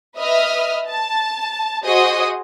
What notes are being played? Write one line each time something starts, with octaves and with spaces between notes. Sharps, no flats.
B4 D#5 E5 D#6 F6
A5
F#4 G#4 C5 D#5 D#6